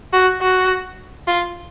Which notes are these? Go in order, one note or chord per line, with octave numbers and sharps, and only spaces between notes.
F#4
F#4
F4